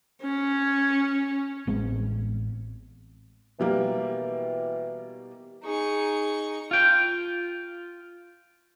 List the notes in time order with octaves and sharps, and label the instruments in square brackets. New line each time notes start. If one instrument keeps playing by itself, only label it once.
[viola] C#4
[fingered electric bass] A1 G#3 B3 C4
[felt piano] B2 G3 A#3 [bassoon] E3
[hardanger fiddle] D#4 C#6 [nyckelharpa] G#4
[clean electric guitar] F4 G5